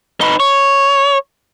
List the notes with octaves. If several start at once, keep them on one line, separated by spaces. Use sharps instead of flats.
D#4 B4
C#5